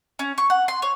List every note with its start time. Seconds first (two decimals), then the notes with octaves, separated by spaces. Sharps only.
0.19 C#4
0.38 C#6
0.50 F#5
0.68 C6
0.82 C#5